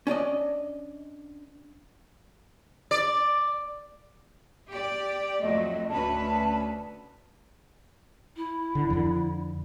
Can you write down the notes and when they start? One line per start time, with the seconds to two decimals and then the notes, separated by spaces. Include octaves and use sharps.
0.07 C#4 D4 D5 D#5
2.91 D5
4.70 G4 D5
5.41 F2 F#3 A3 D#5
5.89 D2 C#4 B4 A5
8.36 E4
8.75 D3
8.90 F2 D3